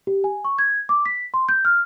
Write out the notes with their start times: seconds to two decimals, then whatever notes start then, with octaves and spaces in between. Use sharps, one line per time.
0.07 G4
0.24 G#5
0.45 C#6
0.59 G#6
0.89 D6
1.06 B6
1.34 C6
1.49 G6
1.65 F6